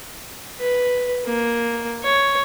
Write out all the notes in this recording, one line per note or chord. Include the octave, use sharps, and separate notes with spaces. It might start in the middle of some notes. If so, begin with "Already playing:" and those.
B4
A#3
C#5